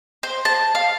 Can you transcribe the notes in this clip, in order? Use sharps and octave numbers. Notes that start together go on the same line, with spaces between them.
C5
A5
F5